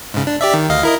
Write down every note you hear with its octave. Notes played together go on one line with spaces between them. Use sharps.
G#2 C#3
D4
G4 D5 E5
D#3
D2 D#5 F5
E4 A#4 D#5